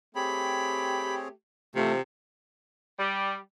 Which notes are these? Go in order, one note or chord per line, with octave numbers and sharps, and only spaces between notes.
A3 C4 G4 G#4 C#5 B5
C3 E3 F3 A3
G3